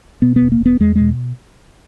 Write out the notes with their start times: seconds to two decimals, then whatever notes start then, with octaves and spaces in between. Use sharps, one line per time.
0.22 B2 B3
0.36 B3
0.42 E1
0.52 A#3
0.61 E1 B3
0.80 E2 G#3
0.95 B2 G#3